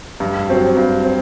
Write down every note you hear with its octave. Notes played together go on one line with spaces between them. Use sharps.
G2
F#3 C4
G2
C4